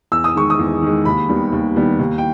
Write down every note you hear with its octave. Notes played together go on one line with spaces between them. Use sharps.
E2 E6
D#6
D#3 G#3 C#6
D#6
E2
D#3 G#3
D#2 B5
D#3 G3 B3
D#2
D#3 G3 B3
D#2
G5